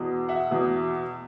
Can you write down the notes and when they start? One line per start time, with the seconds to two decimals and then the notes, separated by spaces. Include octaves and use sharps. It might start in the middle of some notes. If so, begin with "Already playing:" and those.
Already playing: E2 B2
0.29 E5 F#5
0.51 E2 B2